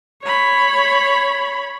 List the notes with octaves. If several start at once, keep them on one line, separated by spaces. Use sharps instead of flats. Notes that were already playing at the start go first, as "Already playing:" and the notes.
C#5 B5